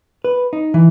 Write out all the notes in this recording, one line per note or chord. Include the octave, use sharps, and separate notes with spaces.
B4
D#4
E3